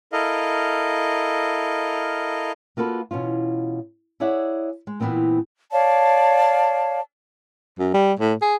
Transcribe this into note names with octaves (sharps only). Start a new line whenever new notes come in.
E4 A4 A#4 D#5 F5
A#3 F4 F#4 A4 B4
B2 E3 C#4 F4
E4 G#4 C#5 D5 E5 F#5
G#3
A#2 E3 G#3 B3 C4 D#4
C#5 D5 F5 A5
F#2
G3
A2
G#4